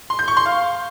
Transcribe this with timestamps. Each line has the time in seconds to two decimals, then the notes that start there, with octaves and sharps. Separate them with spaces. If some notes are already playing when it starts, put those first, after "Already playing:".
0.10 C6
0.19 G6
0.28 C#6
0.37 C6
0.46 F5